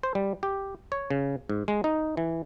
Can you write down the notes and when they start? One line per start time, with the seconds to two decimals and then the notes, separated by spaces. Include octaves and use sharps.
0.03 C5
0.15 G3
0.43 G4
0.92 C#5
1.10 C#3
1.50 G#2
1.68 G#3
1.84 D#4
2.17 E3